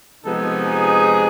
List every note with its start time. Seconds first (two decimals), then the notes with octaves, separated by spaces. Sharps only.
0.24 C3 F3 G#3 B3 D#4 A4
0.65 G#4